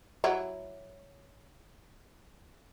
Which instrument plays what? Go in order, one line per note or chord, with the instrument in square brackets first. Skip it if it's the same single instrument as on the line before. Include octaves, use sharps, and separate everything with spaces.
[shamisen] F#3 E4